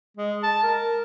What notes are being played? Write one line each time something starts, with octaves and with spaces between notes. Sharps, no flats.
G#3
A5
A#4